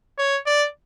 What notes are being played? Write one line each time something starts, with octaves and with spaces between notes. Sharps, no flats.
C#5
D5